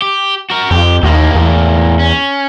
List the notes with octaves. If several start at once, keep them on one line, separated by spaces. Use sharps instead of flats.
G4
F#4 A#4
F2 G4
D#2 A2 A#3
E2
C#4